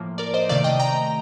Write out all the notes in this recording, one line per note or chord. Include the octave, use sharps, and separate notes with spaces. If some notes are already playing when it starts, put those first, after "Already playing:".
Already playing: A2 F3 A#3
A#4 D5
C5 D#5
C3 D#3 A3 D5 F5
D#5 G5
G5 A#5